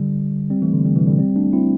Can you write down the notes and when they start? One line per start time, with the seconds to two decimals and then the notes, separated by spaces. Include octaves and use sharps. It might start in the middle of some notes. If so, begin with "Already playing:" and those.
Already playing: D3 G3
0.50 G3 C4
0.62 E3 A3
0.73 D3
0.85 D3 G3
0.96 C3 E3
1.07 D3 G3
1.18 G3 C4
1.36 A3 D4
1.53 C4 E4